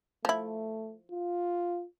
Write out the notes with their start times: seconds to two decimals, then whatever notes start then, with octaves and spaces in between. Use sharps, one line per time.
0.25 F3 A3 E4
1.11 F4